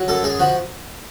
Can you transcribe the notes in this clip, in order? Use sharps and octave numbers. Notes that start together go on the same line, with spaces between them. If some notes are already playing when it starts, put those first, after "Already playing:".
Already playing: F#3
F#2 A4
F#2 G#4
F3 F#4